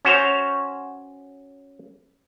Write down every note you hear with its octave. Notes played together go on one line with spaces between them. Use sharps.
C#4 F#4 C5 C#5